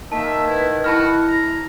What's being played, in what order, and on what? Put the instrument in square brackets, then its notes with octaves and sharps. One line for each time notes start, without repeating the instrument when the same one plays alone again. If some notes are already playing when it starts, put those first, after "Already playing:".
[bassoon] D#3 [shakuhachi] A#3 [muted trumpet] E5 [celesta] A5
[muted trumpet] E4 [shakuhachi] B4
[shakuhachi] E4 [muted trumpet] F#4 [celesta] A5 B5 F6
[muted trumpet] A#5